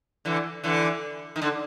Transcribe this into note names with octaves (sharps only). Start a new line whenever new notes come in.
D3 E3
D3 E3
D#3
D3